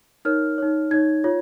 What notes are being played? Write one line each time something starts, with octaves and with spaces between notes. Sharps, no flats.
D#4 A#4 C#5 F6
D#4 C#5
D#4 C#5 G#6
F4 C#5